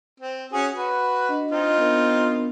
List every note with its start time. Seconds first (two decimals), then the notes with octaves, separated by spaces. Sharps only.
0.20 C4
0.52 C#4 F#4 G#4
0.76 F#4 B4
1.29 D4 D#5
1.51 C4 D#4 F4
1.77 B3 D4 A#4